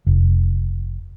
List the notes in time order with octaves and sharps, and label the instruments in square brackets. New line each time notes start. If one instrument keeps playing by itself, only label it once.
[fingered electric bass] F1